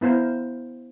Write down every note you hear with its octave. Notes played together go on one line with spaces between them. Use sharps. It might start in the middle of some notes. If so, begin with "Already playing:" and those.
B3 E4 C5 F5 A#5